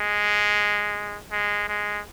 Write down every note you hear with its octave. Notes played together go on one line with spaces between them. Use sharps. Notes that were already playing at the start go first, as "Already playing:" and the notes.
Already playing: G#3
G#3
G#3